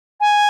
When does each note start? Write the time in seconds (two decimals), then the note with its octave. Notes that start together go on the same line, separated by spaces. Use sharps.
0.21 G#5